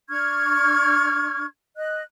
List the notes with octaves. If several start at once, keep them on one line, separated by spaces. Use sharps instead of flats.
D4 C#6 F6 G#6
D#5 F#6